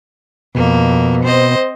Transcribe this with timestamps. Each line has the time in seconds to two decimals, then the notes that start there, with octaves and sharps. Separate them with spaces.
0.55 F2 B2 A#3
1.24 C4 C5 D#5